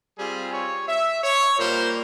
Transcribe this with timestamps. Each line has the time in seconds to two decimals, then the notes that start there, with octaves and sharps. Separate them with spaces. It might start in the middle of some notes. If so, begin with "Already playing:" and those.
0.18 G3 C4 F4 G#4
0.53 C#5
0.88 E5
1.23 C#5
1.59 A#2 G3 A#3 C5